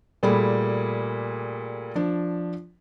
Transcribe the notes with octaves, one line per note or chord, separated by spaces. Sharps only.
A#2 G3 A3 G#4 B5
F3 D4